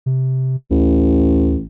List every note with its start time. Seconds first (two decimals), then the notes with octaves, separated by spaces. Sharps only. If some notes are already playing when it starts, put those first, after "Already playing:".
0.06 C3
0.71 A1 D2